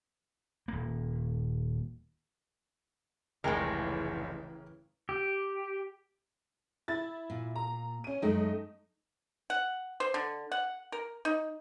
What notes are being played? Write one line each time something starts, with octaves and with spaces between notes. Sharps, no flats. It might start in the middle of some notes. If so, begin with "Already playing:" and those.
D#1 A#3
F1 C#2 A2 C#3 E3 G#3 A#4 G5
G4
E4 A6
A#2
A#5
C#4 D#7
F#2 G#3 A3 D#4 D#5 G5
F#5
C5
D3
F#5
A#4
D#4